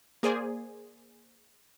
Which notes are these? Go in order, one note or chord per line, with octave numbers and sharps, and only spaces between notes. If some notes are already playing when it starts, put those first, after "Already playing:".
A#3 G#4 C5 D5 G#5